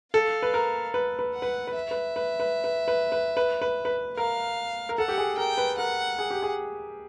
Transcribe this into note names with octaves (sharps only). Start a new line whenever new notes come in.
A4 F5
B4
A#4
B4
B4
F#5
B4
B4
E5
B4
B4
B4
B4
B4
B4
B4
B4
B4
A#4 F5
A#4
A4 F#5
G4
G#4
A#4 G5
B4
A#4 F#5
G#4
G4
G#4